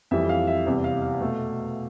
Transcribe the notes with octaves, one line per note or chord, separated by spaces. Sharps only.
F2 E3 G3 E5
F5
E5
E2 C3 G3
F5
F5
B2 A3